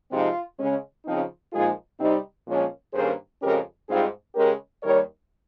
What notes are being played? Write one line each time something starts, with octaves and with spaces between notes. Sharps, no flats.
C3 F3 G#3 C4 D#4 F4
C#3 G#3 C#4
C#3 F3 C4 D#4
A#2 F3 G#3 D#4 F4 G#4
C3 G3 C4 D#4
A#2 F3 G#3 C#4
G2 D#3 A#3 C#4 G#4 C5
F2 C#3 G#3 C#4 G4 A#4
G#2 G3 C4 D#4 F4 G#4
C#3 G#3 C#4 G4 A#4
D#2 D#3 G3 A#4 C#5